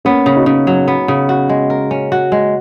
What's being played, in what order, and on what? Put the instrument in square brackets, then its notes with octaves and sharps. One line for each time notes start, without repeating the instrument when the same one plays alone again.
[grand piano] A#3 C#4 [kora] B3
[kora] C#3
[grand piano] D#4 F#4
[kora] C#3
F#3
B3
C#3
F#4
G#3
A#4
C#4
F#4
G#3